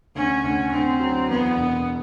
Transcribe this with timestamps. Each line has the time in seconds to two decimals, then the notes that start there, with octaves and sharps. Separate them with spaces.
0.15 D2 C#4
0.44 D2
0.72 D2 C4
1.00 F#3
1.29 E2 B3
1.57 E1